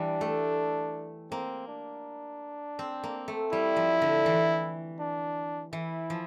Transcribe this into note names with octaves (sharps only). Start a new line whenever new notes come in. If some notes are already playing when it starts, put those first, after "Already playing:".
Already playing: E3 G3 D4
A3
A#3 C4
D4
C4
A#3
A3
G3 E4
F3
D3
E3
D4
E3 E4
F3